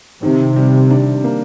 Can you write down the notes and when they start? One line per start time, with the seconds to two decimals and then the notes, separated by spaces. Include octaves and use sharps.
0.23 C3 D#3
0.56 G3
0.90 D4
1.24 A#3